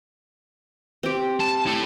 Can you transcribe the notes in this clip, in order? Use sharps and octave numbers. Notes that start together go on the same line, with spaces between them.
C4 G4
A5
E4 A4